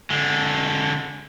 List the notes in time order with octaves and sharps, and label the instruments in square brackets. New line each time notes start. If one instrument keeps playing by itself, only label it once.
[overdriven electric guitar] D3 G#3